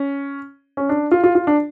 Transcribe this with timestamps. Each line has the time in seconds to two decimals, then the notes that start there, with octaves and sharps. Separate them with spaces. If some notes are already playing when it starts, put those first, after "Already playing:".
Already playing: C#4
0.77 C#4
0.89 D4
1.11 F4
1.24 F4
1.35 F4
1.47 D4